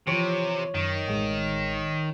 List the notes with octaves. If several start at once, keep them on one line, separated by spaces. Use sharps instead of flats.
C3 E3 F3 C#5
F#2 D#3
A1 G#3